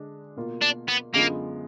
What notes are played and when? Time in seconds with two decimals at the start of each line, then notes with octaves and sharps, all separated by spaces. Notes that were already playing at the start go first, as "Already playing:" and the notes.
Already playing: D3 G#3 D4
0.37 B2 A#3 F4
0.62 D4
0.89 B3
1.14 F#2 D3 G#3 A#3 B3 F4